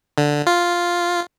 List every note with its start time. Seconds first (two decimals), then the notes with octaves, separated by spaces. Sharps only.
0.18 D3
0.47 F4